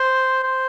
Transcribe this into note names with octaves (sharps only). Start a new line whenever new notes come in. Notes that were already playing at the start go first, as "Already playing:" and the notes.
Already playing: C5
C5